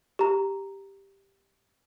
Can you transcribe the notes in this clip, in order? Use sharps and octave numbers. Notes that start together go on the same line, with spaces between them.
G4 A#5